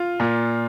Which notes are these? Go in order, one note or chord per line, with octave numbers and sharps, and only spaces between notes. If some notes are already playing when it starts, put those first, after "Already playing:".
Already playing: F4
A#2